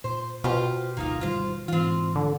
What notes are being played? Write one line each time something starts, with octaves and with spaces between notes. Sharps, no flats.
A#2 C5
B2 F4 G4 C5
D1 G1 A#3 D#4 F4
G1 D#3 G3 F4 C5
G#2 E3 C4 F4
D3